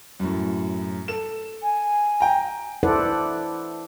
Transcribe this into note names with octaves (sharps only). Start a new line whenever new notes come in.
F#2 A2
A4 E7
G#5
G5 A#5
E4 A4 B4 C5 D5 F#5